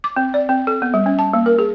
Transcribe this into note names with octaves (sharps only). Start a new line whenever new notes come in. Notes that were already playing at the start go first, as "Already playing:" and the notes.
D6
C4
D5
C4
A4
B3
G3
C#4
A5
A#3
A#4
G#4